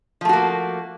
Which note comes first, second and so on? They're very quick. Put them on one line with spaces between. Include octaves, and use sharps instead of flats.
F3 A3 F#4 A#3